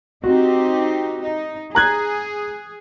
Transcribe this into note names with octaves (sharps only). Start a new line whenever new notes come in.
C4 D#4 F#4 G4
D#4
G#4 A#5 F#6 G#6